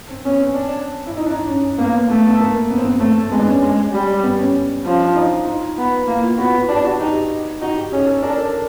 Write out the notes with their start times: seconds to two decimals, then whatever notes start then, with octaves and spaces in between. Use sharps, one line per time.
0.09 C4
0.25 B3 C#4
0.40 C4
0.55 D4
1.06 E4
1.17 D#4
1.26 D4
1.32 D#4
1.48 C#4
1.78 A#3 B3
2.08 A3 B3
2.27 B3
2.40 A#3
2.70 B3
2.78 C4
2.85 B3
3.00 A3 C4
3.22 C4
3.31 G#3 B3
3.39 D4
3.47 C#4
3.62 G#3
3.92 G3
4.24 B3
4.39 C#4
4.85 F3 C#4
5.00 D4
5.16 D#4
5.46 D#4
5.78 B3
6.08 A#3 E4
6.23 F4
6.38 B3 F#4
6.53 F#4
6.69 D4 G4
6.84 F#4
7.00 D#4 G4
7.61 D#4 F#4
7.77 G4
7.92 C#4 G#4
8.07 A4
8.22 D4 A#4
8.38 A4